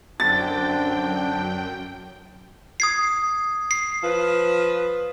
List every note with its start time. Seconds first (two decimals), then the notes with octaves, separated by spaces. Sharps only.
0.20 F#2 D3 C4 D4 G5 A6
2.80 D#6 G#6 C7
3.71 C7
4.04 F3 B4